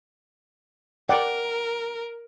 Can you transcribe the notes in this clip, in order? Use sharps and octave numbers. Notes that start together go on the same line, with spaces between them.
A#4 D5 F#5 G5